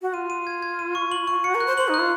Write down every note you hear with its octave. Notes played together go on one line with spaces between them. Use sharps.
F#4
F4 D#7
D#7
G#6
G#6
D#7
C#6
F#7
C#6
F#4 C#7
A#4
F#6
C5
C5 F#7
D#4
F#6
F4